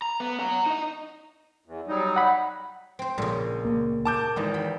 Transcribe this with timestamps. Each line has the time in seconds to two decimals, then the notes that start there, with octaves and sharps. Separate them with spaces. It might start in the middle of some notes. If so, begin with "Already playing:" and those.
0.02 A#5
0.20 B3
0.40 F#5 A#5
0.66 D#4 D#5
1.66 E2
1.88 F#3 G3 D#4
2.16 F#5 B5
2.99 C4 C5
3.18 A#1 A#2 C#3
3.65 C#2 A#3
4.05 A#4 A5 D6 G6
4.36 G#1 E3 D#4 D#5
4.54 G5 B5